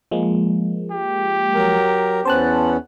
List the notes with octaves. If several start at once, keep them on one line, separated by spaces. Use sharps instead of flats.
F3 G#3 A#3
G4
F#3 A#4 A#5
E2 B3 C#4 C5 A5 F#6